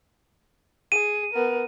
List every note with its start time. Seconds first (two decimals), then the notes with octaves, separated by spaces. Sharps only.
0.92 G#4 D#7
1.33 B3 A#4